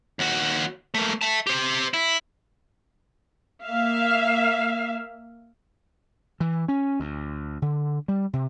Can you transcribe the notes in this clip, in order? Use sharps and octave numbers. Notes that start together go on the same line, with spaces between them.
D#2 F#4
A3 A#3
E5 A5
G4 C5
E4
A#3 E5 F5
E3
C#4
D2
D3
G3
C3